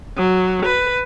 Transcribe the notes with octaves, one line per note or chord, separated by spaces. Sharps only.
F#3
B4